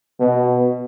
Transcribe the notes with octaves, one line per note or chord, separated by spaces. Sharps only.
B2